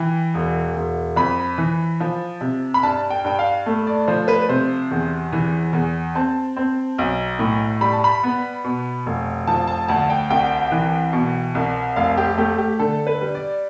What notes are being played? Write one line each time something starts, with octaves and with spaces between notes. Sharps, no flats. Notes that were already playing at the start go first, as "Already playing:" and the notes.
Already playing: E3 G5
E1
E1
F2 B5
E3
F3
C3
B5
G2 A5
G5
G2 G5
F5
A3
D5
F3 C5
B4
C3 C5
E2
E3
E2
C4 A5
C4
B1
A2
G3 B5
A5
B5
B3
B2
F1
F3 A5
A5
D2 A5
G5
C2 G5
E3
B2
C2
F1 F5
G4
A3 G4
G4
D3 A4
B4
G3
D5